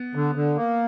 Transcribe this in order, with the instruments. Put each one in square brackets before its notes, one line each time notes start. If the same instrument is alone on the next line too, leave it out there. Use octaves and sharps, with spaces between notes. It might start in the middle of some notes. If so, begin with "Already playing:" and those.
Already playing: [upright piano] B3
[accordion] D3
D3
A#3